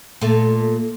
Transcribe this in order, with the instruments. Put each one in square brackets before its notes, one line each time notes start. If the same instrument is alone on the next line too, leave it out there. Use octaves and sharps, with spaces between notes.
[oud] A#2 A3